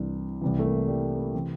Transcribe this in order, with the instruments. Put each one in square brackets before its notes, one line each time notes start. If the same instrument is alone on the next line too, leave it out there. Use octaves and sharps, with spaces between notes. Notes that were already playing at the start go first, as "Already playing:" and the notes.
Already playing: [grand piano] C2 C3 E3 D4
C2 C3 E3
A3
A#3
G3
A#3
C3 E3 C4